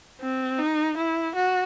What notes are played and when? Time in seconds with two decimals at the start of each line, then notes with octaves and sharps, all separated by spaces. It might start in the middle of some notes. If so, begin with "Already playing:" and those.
0.21 C4
0.58 D#4
0.97 E4
1.35 F#4